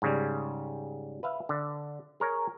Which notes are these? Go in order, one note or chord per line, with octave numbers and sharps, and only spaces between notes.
G#2 C#3 G3
B4 E5 F5
D3
G#4 A#4 C#5